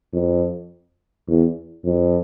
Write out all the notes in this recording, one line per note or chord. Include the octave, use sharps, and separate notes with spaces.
F2
E2
F2